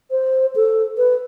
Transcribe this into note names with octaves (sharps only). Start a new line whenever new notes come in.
C5
A4
B4